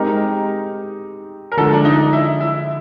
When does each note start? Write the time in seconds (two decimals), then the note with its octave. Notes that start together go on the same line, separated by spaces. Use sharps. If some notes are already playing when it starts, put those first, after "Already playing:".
Already playing: G#3 C4 D#4 G4 A#4
1.52 A#4
1.57 D3 F3 G#3 A4
1.73 D4
1.85 D#4
2.13 E4
2.40 E4